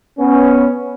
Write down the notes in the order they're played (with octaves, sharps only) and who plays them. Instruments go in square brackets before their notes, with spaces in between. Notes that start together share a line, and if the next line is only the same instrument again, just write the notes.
[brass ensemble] B3 C#4